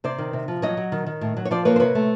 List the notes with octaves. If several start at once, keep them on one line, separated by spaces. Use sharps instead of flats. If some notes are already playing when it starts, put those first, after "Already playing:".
C3 C5 D5
D#3
C3
F3
F#3 C#5 D#5
F#3
D#3
D#3
A2
F#3
C#5
F3 C5 D5
A#3 B4 C#5
C5
C3 B4 C#5
A3